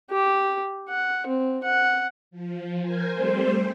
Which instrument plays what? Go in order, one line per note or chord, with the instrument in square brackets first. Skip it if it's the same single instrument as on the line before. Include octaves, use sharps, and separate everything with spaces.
[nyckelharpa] G4
F#5
C4
F#5
[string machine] F3
A#4 C5 G#5
G3 A3 C4 C5